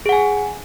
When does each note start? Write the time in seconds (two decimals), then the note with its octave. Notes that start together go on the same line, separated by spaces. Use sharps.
0.06 G#4
0.09 F#5
0.13 G#5